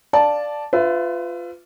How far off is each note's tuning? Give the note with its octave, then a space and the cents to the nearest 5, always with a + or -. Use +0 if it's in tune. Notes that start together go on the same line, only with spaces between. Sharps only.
D5 +0 F5 +0 A5 -5
F4 +0 B4 +30 E5 +20